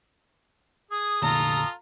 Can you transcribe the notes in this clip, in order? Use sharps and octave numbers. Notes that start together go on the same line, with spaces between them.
G#4 D#6
F1 A#2 D3 F4 A4 A#5